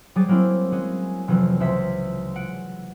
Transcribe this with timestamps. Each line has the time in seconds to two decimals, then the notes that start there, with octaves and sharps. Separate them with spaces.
0.15 F#3 G3 G#4 D6 A6
0.28 F#3 A#3 C4 E4
0.72 G#3 C#4 F#4 G#4
1.28 F1 E3 F#3 C4
1.60 C#2 C5 E5 C6 B6
2.36 F#5 D7